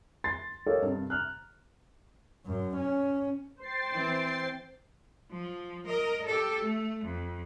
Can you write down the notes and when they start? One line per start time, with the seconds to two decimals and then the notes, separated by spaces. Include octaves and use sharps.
0.24 C6 A6 C7
0.66 G4 A4 A#4 C#5 D#5 F5
0.82 G2 C3
1.10 A#5 F6 F#6
2.46 F#2
2.77 C#4
3.61 C5 G5 A6 C7
3.91 E3 C4
5.31 F3
5.86 A#4 D#5
6.26 G4 A4
6.63 A3
7.04 F2